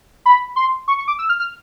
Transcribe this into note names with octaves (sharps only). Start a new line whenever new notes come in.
B5
C6
C#6
C#6
D6
E6
F6
F6